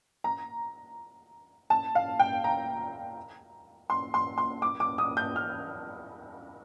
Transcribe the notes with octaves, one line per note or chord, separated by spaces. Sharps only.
A#5
A5
F5
G5
A#5
C6
C6
C6
D6
D6
D#6
G6
F6